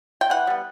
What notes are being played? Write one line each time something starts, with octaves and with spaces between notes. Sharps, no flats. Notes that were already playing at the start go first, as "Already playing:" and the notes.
G5
E3 F#5
G3 B3